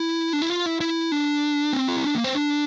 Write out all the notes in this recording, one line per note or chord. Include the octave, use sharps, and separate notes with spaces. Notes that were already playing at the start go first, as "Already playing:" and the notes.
Already playing: E4
D4
E4
F4
E4
E4
D4
C4
F4
E4
D4
A#3
C4
D4